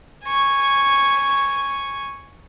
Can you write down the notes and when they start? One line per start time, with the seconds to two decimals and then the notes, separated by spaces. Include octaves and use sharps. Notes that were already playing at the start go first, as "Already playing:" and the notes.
0.24 G#5 C#6